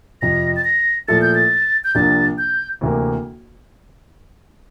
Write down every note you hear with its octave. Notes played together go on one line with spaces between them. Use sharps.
F2 C3 F3 A#6
A6
A#6
A#2 F3 A3 E4 A4 A6
G6
A6
G6
C2 C3 F3 A#3 D4 A6
G6
D2 C3 E3 A#3